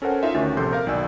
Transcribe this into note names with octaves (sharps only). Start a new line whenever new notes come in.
C#4 A4 A#4 C5 F#5 G#5
D#4 F4 E5
D2 D#3 C#4 F#4 A6
A#1 C3 A4 C6 G6
A#4 F5
B1 D#3 F#4 D5 G#5 E6